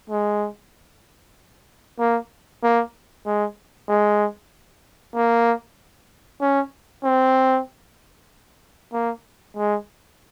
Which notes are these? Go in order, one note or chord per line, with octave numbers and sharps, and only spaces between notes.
G#3
A#3
A#3
G#3
G#3
A#3
C#4
C4
A#3
G#3